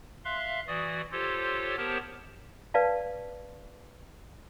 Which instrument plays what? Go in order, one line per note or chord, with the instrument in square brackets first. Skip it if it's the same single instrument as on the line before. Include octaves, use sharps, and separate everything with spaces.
[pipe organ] E5 F5 C6 F#6
E3 F#4 D5 D#6
F4 G4 A4 C5 C#5
B3 G4 A#4 C5 C#5 A5
[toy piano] B4 D5 F5 A5